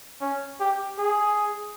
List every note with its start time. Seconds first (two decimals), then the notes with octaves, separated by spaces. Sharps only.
0.21 C#4
0.60 G4
0.98 G#4